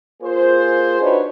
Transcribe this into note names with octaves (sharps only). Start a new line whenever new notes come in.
A#3 F4 G#4 C5
D4 D#4 F#4 B4 C#5